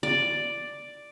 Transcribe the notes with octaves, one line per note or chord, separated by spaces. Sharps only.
D5